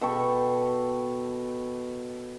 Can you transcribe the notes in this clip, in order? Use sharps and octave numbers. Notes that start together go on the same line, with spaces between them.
B2 A4 G5 C#6